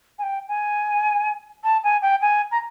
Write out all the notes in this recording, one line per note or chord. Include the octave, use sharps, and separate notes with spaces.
G#5
G5
G#5
A5
G#5
G5
G#5
A#5